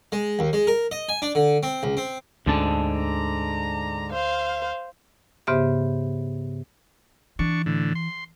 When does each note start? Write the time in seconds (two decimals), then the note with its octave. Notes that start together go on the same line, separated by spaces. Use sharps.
0.12 G#3
0.39 D#2
0.53 G#3
0.67 A#4
0.91 D#5
1.09 G#5
1.22 D4
1.35 D3
1.63 C4
1.83 C#2
1.97 C4
2.46 D2 G#2 D3 C#4 A5
2.99 A#5
4.13 C5 F5
5.47 G#2 C#3 B3 G4 C5 E5
7.39 E3 D4 C#6
7.66 A2 D3
7.95 C6